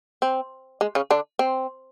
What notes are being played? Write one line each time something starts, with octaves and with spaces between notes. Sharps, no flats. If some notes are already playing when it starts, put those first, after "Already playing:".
C4
G#3
C#3 C#4
D3 D4
C4